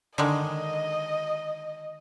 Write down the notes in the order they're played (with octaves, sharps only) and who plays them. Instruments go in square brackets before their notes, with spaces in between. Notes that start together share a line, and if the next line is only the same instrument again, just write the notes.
[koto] D3 D#3 G#3 [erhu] D#5